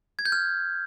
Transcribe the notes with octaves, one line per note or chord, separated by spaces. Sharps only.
G#6
G6
F6